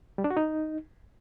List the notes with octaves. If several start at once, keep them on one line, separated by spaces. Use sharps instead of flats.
G3
D4
F#4
D#4